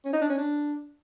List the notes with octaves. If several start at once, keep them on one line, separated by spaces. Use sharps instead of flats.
C#4
D#4
D4
C#4
D4